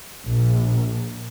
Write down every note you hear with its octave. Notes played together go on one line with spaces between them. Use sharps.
A#1